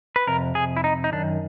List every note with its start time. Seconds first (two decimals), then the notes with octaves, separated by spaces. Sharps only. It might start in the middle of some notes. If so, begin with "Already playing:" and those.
0.16 B4
0.27 F2 C3 A#4
0.55 G#4
0.77 E4
0.84 D#4
1.04 D#4
1.12 F#2 D#3 D4